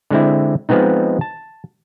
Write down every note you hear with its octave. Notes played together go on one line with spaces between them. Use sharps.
D3 G#3 C4 E4
F3 G#3 B3 C4 D#4
A5